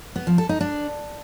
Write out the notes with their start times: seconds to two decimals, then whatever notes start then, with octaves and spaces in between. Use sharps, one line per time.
0.16 B3
0.27 F3
0.38 A4
0.49 D#4
0.61 D4